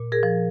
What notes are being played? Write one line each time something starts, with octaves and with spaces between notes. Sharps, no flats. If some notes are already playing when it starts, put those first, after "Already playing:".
Already playing: A#2
G#4 A#4
F3